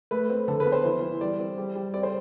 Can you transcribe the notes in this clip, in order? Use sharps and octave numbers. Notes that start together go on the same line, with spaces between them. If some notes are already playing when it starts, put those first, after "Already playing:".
A3 B4
C4
D3 A4
B4
B3
C5
E3
E3
G3 D5
C4
G3
G3
C4 D5
C5